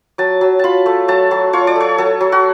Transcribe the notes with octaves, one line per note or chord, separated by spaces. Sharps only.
F#3 A5
F#3
F4 A5 B5
A3
F#3 A5
F#3
F4 C#5
D5
A3 C#5
F#3 A4
F#3
F#4